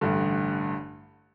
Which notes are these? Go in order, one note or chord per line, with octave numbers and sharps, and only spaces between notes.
A1 G2 D3